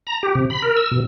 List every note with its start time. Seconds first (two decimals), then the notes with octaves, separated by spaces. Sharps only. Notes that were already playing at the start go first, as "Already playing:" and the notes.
0.07 A#5
0.23 G4
0.35 C3
0.50 B5
0.62 A#4
0.77 E6
0.91 B2